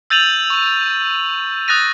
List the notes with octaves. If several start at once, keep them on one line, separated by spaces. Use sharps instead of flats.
E6 G6 A6 D#7 F7 F#7
C#6
D#6 F#6 A6 A#6 D#7